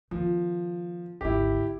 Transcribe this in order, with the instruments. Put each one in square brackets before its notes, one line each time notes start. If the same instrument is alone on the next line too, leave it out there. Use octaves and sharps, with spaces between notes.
[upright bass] D#3 B3 [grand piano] F3
[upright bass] G#1 D2 [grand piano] E4 G4